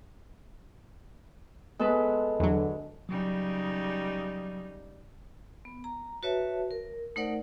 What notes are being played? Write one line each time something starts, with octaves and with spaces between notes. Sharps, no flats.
G#3 B3 A4 B4
E2 D3 F#3
C#3 F#3 G3 D#4
B3
A#5
F#4 B4 C#5 E5 A5
A#4
A3 D#4 A#4 C5 D5 F#5